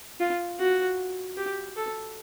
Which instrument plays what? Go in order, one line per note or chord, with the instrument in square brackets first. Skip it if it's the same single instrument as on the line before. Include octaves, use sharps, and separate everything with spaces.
[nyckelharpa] F4
F#4
G4
A4